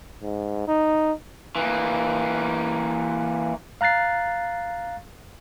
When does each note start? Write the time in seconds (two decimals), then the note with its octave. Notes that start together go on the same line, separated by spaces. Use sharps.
0.22 G#2
0.68 D#4
1.56 E3 A#3
3.81 F5 A#5 F#6 A6 C7